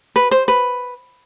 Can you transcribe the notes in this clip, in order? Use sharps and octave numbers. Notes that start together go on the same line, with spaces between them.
B4
C5
B4